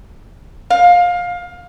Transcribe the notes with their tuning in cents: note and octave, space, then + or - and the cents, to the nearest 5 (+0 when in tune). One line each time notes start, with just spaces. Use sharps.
F5 +20